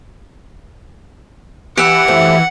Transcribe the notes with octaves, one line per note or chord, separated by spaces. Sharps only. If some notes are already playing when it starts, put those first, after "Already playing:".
E3 G4 E5 F#5
F#2 A3 C4